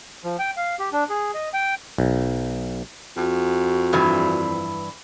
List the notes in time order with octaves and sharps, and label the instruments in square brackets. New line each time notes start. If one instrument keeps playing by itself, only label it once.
[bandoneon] F3
G5
F5
G4
D4
G#4
D#5
G5
[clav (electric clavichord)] B1
[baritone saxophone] F2 [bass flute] F#4
[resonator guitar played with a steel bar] G2 E3